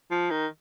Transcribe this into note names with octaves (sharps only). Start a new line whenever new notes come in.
F3
D#3